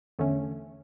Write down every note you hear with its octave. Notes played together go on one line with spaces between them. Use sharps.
E2 D3 A3 C#4